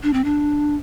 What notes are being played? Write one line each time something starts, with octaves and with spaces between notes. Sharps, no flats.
D4
C4
D4